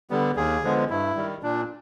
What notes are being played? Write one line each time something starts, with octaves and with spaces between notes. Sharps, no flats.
D3 G3 B3
D#2 G#4
D3 F3 G#3 B3
G2 E4
D#3 G3
A#2 D4